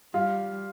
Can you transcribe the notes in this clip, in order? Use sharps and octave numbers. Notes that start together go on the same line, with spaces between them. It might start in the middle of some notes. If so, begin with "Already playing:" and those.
G3 F4